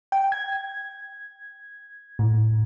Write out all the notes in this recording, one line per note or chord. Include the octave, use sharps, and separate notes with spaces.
G5
G#6
A2